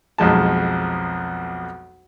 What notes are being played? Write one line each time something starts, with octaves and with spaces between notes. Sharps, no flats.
B1 F2 G#3 A5